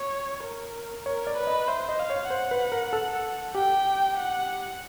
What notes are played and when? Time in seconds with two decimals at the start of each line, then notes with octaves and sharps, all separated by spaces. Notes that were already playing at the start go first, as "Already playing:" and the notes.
Already playing: C#5
0.43 A#4
1.06 A#4 C#5
1.27 D5
1.37 B4
1.47 D#5
1.68 C5 E5
1.89 D#5
1.99 F5
2.10 C#5
2.30 C5 F#5
2.51 B4
2.72 A#4
2.93 A4
3.55 G4 G5
4.17 F#5